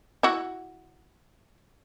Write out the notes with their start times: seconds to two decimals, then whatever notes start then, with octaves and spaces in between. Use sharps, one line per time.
0.23 E4 F#4